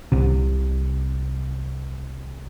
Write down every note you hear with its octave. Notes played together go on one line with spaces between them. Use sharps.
C2 C3